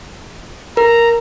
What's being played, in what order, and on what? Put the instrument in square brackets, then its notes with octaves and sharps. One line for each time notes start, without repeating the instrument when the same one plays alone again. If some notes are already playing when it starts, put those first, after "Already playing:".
[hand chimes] A#4 [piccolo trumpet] A#5